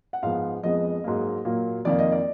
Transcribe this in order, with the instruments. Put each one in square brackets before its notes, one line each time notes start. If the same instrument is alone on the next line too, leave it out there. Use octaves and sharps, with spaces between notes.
[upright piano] F#5
G#2 F3 B3 F5
F2 F3 G#3 B3 D#5
G#2 F#3 A#3
A#2 F#3 A#3
F2 D#3 A#3 D5
D#5
D5